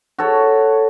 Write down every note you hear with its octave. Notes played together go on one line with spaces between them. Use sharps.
F#4 A4 C#5